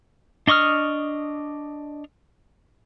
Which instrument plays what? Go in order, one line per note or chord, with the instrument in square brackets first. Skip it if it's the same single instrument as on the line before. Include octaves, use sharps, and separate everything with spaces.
[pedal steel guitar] D4 D#5 C#6 D#6 F6